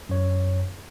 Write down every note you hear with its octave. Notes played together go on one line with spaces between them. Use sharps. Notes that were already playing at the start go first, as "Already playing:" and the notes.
F#2 C#5